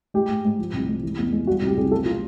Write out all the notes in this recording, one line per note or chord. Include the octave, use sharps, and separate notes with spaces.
G#3 G4
G#2
G#2
F3
C2
G#3
E3
E2
G#3
G3 F#4
C2
G4
C2 G#4
F#3 A4
F4